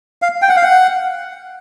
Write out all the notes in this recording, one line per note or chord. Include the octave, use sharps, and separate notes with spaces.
F5
G5
F#5
F5
F#5